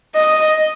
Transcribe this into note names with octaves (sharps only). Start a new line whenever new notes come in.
D#5